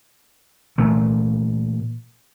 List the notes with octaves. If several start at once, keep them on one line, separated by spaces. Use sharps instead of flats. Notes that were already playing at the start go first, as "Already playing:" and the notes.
A#2 E3 A3